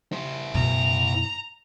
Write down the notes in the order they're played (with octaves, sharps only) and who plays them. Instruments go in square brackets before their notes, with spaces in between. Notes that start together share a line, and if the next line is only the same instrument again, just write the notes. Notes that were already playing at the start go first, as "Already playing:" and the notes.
[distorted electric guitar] E4 C5
[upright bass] F#2 B2 [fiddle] A#5